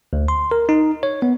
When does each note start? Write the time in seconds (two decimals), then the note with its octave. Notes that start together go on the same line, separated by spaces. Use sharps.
0.13 D2
0.28 C6
0.51 A#4
0.69 D#4
1.03 C#5
1.22 B3